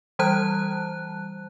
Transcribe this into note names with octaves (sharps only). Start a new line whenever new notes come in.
E3 G3 C5 A5 F#6